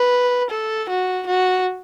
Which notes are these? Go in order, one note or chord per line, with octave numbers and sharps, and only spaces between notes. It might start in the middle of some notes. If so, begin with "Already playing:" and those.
Already playing: B4
A4
F#4
F#4